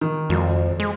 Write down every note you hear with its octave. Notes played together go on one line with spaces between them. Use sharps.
D#3
G#1 F2
G#3